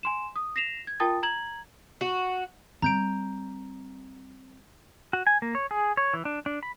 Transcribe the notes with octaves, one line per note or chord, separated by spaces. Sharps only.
G#5 C6 E7
D#6
A#6 C7 E7 F7
G#6
F4 A#4 G5 A5 D#6 A6
A#5 G#6 F#7
F#4
G3 C4 A#5 G6 D7
F#4
G#5
A#3
C#5
G#4
C#5
E3
D4
D4
B5